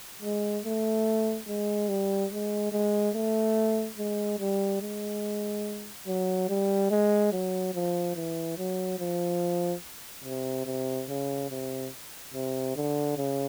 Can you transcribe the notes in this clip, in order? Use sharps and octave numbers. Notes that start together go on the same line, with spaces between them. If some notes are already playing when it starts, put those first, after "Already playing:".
G#3
A3
G#3
G3
G#3
G#3
A3
G#3
G3
G#3
F#3
G3
G#3
F#3
F3
E3
F#3
F3
C3
C3
C#3
C3
C3
D3
C#3